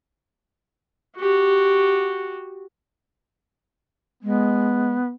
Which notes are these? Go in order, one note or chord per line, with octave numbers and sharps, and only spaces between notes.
F#4 G4
G#3 B3